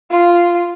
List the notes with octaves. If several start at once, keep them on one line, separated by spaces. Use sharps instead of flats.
F4